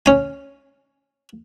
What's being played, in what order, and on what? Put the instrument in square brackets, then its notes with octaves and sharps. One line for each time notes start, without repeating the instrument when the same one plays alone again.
[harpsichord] C#4 G#5